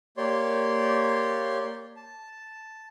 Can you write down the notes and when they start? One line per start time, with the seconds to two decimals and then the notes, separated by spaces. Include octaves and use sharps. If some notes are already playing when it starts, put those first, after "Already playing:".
0.17 A#3 G4 C#5 D5 C6
1.96 A5